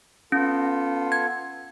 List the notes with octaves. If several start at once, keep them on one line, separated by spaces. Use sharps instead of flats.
B3 C#4 F4 A4
G#6